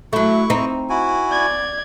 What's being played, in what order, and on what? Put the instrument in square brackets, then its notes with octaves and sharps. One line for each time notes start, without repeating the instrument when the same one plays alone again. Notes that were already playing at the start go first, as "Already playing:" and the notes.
[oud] F#3 A3 [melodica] E4 C#6
[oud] C4 D#4
[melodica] E4 F#4 G#5
[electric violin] D5 G#6